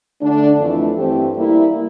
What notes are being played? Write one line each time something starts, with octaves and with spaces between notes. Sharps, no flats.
D3 A3 D4
F2 E3 A3 E4
G2 E3 A3 C4 G4
G3 A#3 E4